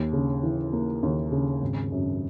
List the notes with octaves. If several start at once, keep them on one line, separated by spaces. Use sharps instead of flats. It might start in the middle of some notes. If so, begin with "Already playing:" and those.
Already playing: D#2
C#3
E3
A#3
D#2
C#3
G#1
F#2